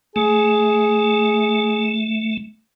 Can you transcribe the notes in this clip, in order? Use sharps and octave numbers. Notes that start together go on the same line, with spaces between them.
A3 G#4